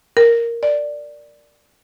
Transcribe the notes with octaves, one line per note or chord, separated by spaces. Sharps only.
A#4
D5